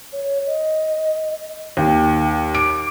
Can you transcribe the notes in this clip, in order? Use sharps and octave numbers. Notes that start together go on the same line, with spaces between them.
C#5
D#5
D#2 G5
D6 D7